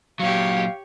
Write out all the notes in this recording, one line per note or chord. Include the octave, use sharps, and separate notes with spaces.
A#2 F#3 G4 C#5 F5